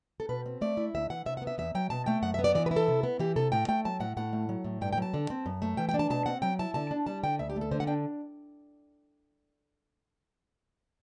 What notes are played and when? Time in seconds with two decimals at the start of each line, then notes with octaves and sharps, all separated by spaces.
0.20 A4
0.29 B2 B4
0.46 C4
0.61 A3 D5
0.77 E4
0.94 D2 E5
1.10 E3 F#5
1.26 C3 E5
1.37 F#5
1.42 B3
1.47 E5
1.58 E2 E5
1.75 F#3 G5
1.90 B2 A5
2.06 A3 G5
2.22 F#2 F#5
2.34 E5
2.39 B3
2.44 D5
2.55 E3 D5
2.66 B4
2.71 E4
2.76 A4
2.88 C3
3.03 B3
3.19 E3 G4
3.36 C3 A4
3.52 A2 G5
3.68 A3 G5
3.85 F#3 A5
4.00 A2 F#5
4.17 A2 F#5
4.33 A3
4.49 F#3
4.64 A2
4.81 G2 G5
4.93 G5
4.98 F#3 A5
5.14 D3
5.30 C4
5.46 F#2
5.62 A3
5.77 E3 G5
5.89 G5
5.94 D4
5.99 A5
6.10 B2 A5
6.26 C4 F#5
6.42 F#3 G5
6.59 E4 A5
6.74 D3 A5
6.91 D4
7.07 G3 A5
7.23 D3 G5
7.39 D2 E5
7.50 G4
7.56 A3
7.61 A4
7.71 D3 C5
7.80 F#5
7.87 D4 G5